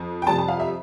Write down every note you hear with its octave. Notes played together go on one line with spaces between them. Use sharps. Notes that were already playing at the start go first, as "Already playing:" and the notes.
Already playing: F2
G5
F2 C3 G3 A5
A5
F5
E5